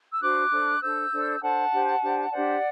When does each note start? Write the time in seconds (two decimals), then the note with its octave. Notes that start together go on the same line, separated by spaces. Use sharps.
0.12 E6
0.20 D4 F#4 C5 D6 F#6
0.50 D4 A4 C5
0.80 D4 A4 C5 E6 G6
1.11 D4 A4 C5
1.40 D4 A4 C5 F#5 A5
1.71 D4 G4 C5
2.01 D4 G4 C5
2.31 D4 G4 C5 D5 F#5